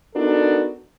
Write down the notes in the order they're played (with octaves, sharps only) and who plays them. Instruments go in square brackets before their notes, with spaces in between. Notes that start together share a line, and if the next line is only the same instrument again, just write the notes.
[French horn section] B3 D4 D#4 F#4 A4 A#4